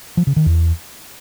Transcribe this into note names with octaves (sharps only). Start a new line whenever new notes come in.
F3
C#3
D#3
E2